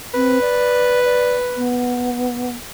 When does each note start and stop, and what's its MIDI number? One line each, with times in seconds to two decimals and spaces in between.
0.14 0.38 60
0.14 1.72 71
0.41 1.02 74
1.04 1.36 74
1.56 2.54 59